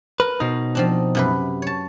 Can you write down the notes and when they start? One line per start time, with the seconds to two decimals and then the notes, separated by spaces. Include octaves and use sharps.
0.20 A#4 B4
0.40 B2 D#4 C5
0.75 F3 C4 D4
1.15 F#2 C3 B4
1.62 C#5 A5